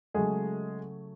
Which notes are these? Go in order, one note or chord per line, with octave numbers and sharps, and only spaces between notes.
C#3 F#3 G#3 A3 G#4